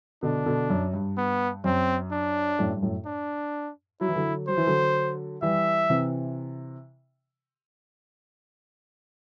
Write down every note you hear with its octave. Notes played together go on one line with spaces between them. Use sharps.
B2 D3 D4
B2 D3
F#2
G2
B3
F#2 C4
D4
F#2 A2
G2
F#2 A2
D4
F#3 E4
E3
D3 F#3
F#3 C5
E3
D3 F#3
E3 G3 E5
C3 E3